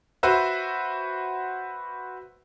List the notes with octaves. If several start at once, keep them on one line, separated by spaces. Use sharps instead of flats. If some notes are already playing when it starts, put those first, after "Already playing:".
F#4 B4 C5 E5